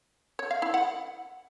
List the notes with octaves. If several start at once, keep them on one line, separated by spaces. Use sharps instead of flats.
C#5
F5
E4
F#5